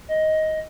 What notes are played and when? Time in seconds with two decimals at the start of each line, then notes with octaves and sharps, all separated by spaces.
0.08 D#5